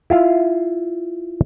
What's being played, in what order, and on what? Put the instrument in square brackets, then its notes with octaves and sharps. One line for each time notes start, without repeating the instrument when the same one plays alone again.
[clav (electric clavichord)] E4 F4 F5